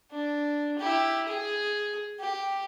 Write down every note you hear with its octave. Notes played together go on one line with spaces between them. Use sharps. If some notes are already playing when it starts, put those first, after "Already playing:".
D4
E4 G4
G#4
G4